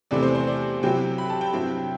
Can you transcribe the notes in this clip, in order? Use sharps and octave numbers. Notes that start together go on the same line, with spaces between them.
E2 C3 E3 A3 C4 D5
C5
C5
D5
C3 F#3 C4 E4 G5
B5
A5
G5
G2 F#3 C4 E4